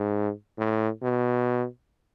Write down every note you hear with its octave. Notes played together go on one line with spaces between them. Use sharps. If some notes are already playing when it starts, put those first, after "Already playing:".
Already playing: G#2
A2
B2